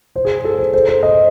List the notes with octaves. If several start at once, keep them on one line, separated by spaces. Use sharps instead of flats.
C5
G#4
A4
C5
C5
C5
D#5